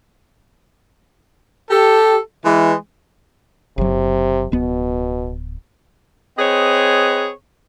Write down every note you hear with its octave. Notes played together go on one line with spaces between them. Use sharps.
G4 A4
E3 G#3
F#1 C3 F#3
D1 B2 B3
C4 G#4 B4 C#5 D#5